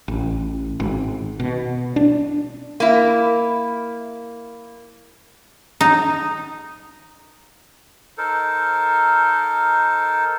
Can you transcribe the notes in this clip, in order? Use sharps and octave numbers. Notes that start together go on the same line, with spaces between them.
A1
G#1
B2
D4
A#3 E4
D#4
D#4 A4 A#4 C5